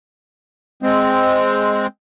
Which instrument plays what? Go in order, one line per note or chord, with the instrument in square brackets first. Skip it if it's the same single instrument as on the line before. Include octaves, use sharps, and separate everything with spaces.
[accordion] G#3 C4